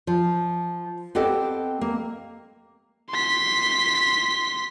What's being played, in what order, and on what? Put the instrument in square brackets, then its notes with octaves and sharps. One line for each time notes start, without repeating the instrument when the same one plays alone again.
[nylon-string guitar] F3
B3 C4 G4 A4 D#5 G5
A#3
[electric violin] C6 B6